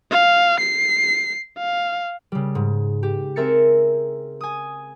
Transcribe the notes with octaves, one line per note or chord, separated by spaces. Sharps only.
F5
C7
F5
C#3 G3
G#2
G4
C4 G#4 A#4 E5 A6 C#7
G#5 D#6